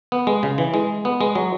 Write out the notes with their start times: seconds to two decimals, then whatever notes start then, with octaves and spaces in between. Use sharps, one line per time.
0.12 B3
0.27 G#3
0.43 C#3
0.58 E3
0.74 G#3
1.05 B3
1.21 G#3
1.35 F#3